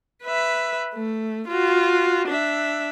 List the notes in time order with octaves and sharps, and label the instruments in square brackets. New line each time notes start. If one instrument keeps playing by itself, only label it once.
[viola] B4 E5
A3
F4 F#4
D4 E5